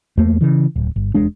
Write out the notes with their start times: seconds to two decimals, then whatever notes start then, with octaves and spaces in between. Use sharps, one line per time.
0.17 E2 A3 A#3
0.41 C#3 E3
0.76 D1
0.96 G1
1.14 E1 G#3 D4